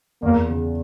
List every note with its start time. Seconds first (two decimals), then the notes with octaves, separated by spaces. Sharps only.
0.22 E2 A#3
0.49 C#3